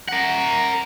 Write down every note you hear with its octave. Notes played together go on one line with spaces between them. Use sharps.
A#4 F#5